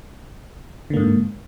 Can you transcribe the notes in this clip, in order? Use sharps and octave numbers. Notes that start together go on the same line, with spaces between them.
G#2 D3 A#3